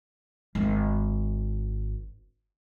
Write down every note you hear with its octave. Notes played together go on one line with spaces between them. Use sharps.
G#1 D4